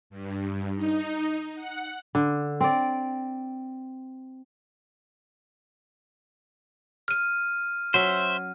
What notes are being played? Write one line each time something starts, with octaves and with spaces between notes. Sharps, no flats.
G2
D#4
F#5
D3
C4 D5
F6 D#7
F#3 C#4 C5 E5